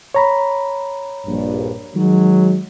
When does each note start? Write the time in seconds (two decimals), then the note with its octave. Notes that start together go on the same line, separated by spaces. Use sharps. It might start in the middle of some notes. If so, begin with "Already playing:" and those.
0.15 C#5 A#5 B5
1.27 A#1 G2
1.95 D#3 F#3 G#3